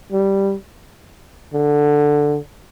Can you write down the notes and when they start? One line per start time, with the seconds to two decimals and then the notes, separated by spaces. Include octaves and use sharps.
0.12 G3
1.53 D3